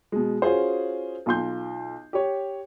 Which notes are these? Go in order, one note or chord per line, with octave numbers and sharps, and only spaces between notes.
B2 G#3
C#4 F4 F#4 G#4 C5
B1 F4 C6 G6
G4 C#5